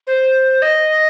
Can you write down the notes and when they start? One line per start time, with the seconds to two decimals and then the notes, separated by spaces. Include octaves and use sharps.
0.07 C5
0.62 D#5